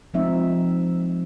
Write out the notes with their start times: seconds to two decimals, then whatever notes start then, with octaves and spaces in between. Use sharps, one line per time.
0.14 F3 G#3 C4 D#4 E5